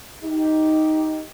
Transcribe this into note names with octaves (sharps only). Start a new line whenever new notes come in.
D#4 G4